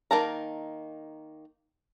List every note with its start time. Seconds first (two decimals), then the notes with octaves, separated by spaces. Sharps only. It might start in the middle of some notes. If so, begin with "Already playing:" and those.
0.11 D#3 A#3 A5 A#5